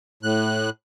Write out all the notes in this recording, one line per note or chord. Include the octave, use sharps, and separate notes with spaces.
A2 F#6